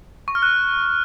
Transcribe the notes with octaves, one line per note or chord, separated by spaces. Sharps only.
C#6
F6
F#6